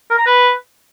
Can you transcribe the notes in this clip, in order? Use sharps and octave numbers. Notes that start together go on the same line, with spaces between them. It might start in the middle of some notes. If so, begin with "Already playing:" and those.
A#4
A#5
B4